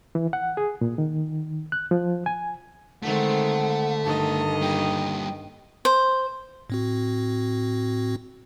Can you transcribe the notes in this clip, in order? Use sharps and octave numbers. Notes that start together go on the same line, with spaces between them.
E3
F#5
G#4
A#2
D#3
F#6
F3
G#5
D3 D#3 G#3 A3 C4 F#5
G2 D#3 D#5 A5
G3 A#3 G5
C5
A2 C4 F#4